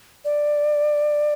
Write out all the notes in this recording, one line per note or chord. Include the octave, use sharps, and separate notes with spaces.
D5